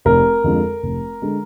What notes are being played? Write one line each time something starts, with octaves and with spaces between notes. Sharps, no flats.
F1 A#4
F2 D3 G#3
F1
D3 G#3